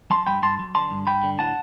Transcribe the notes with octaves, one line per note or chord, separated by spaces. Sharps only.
F#3 A5 C6
G2 G5 B5
G2 A5 C6
F#3
D3 A5 C6
G2
G2 G5 B5
D3
A2 F#5 A5